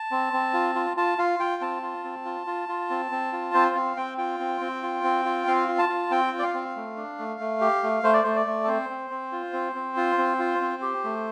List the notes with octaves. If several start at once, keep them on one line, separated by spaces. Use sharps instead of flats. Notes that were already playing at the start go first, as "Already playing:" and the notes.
Already playing: A5
C4
C4
F4
F4
F4 A5
F4 F5
F4 G5
C4 A5
F4
C4
F4
F4
F4
C4
C4
F4
C4 C5
C4 F5
C4 G5
F4 G5
C4
C4
F4
C4
F4
C4 F5
F4
A5
F4
C4 G5
F4
D5
F5
C4
A3
D4
A3
A3
G4
A3
A3 C5
D5
A3 C5
D5
A3
A4
C4 C5
C4
C4
F4
C4
C4
F4
C4
F4
C4
G4
A3